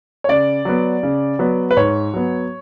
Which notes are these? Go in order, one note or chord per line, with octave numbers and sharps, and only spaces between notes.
C#5
C#3 D5
F#3 B3
C#3
F#3 B3
B4
G#2 C#5
F#3 B3